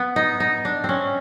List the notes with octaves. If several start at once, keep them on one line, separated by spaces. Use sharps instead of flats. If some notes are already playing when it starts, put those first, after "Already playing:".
Already playing: B3
D#4
D#4
D4
C4 C#4